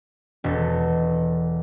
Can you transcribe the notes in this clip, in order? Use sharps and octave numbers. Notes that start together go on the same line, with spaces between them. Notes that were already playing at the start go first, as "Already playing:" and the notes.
E1 A4